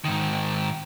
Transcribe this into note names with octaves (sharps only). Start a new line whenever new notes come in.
G#2 D#3